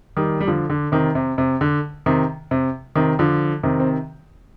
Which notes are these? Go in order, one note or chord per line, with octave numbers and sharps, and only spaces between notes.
D#3 G3
G3
D3 F3
D3
C3 D#3
C3
C3
D3
C3 D#3
C3
C3 D#3
D3 F3
C3 D#3
C4